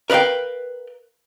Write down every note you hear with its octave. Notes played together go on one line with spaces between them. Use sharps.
A#4 B4 D5 F5 G5